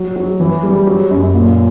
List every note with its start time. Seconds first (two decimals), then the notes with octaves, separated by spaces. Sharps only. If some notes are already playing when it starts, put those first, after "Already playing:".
Already playing: F#3
0.16 F#3
0.40 E3
0.63 G3
0.87 F#3
1.11 F#2
1.34 A#2